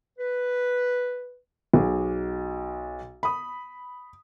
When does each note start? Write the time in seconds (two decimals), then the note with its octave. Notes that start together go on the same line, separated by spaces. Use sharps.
0.19 B4
1.74 B1 G#4
3.23 B5 D#6